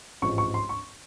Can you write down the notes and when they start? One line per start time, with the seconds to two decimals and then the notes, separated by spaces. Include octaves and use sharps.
0.22 A1 G#2 F3 G#3 C#6
0.38 C#6
0.54 C6
0.69 C#6